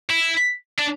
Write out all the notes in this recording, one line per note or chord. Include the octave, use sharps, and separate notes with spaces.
E4
D4